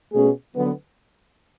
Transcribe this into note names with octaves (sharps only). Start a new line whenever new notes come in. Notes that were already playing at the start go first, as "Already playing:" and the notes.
B2 A3 C#4 G#4
D3 F#3 B3